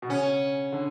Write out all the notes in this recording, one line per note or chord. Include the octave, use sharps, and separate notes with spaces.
B2
C#3 C#4
D3